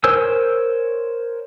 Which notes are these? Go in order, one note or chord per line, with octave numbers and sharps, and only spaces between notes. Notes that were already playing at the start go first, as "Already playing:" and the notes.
A#4 C5 C#5 G#5 E6